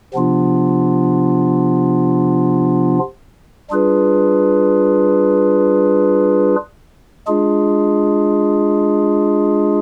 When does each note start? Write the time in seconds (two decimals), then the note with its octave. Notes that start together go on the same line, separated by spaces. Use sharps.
0.14 C3 F3 B3 D4 F4
3.70 G3 D4 F4 G#4 B4
7.27 G#3 D4 F4 G#4